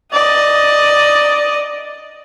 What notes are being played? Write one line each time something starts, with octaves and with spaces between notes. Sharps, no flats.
D5 D#5